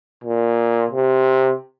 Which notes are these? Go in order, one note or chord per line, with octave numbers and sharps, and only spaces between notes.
A#2
C3